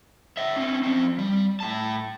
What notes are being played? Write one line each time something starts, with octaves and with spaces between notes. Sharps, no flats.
C#5 E5
C4 C#4
F3 C4
G3
A2 A5